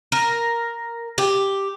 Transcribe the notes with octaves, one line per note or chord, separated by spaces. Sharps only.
A#4
G4